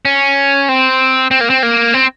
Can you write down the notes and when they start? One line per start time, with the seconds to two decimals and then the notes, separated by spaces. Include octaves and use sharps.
0.05 C#4
0.69 C4
1.31 C4
1.41 A#3
1.50 C4
1.63 A#3
1.94 C4